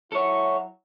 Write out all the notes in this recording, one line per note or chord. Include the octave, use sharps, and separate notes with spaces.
F#3 E4 A4 C#5